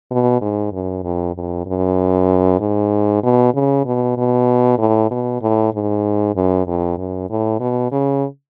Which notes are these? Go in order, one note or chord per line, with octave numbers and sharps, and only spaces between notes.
B2
G#2
F#2
F2
F2
F#2
G#2
B2
C#3
B2
B2
A2
B2
A2
G#2
F#2
F2
F#2
A2
B2
C#3